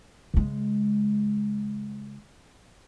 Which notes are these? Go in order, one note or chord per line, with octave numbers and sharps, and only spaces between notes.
C#3 G#3